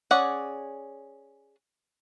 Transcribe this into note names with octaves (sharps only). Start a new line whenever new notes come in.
C#4 G#4 D5 F#5